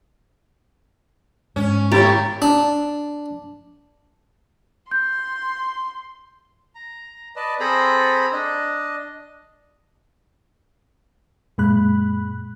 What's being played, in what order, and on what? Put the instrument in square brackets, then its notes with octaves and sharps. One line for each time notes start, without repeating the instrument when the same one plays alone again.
[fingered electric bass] G#2 [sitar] C#4
[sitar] A2 E4 C#5 [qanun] G4 [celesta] A#5 A6
[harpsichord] D4
[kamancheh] C6 [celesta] G6
[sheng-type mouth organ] A#5
B4 D5 D#5 A5
C4 G#4 A4 C5 A#5 B5
D4 D#5
[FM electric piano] F#2 A#2 G#3 B5 F#6